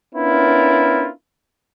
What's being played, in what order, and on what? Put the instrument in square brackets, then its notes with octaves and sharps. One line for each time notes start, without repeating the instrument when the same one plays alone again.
[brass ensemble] B3 C#4 D4 E4 F4 A#4